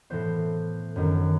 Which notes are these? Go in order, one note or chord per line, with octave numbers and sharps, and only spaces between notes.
A2 E3 B3 C5
G1 F#2 D#3